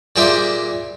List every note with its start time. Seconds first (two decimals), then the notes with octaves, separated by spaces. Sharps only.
0.16 A#2 G3 G#4 C5 E5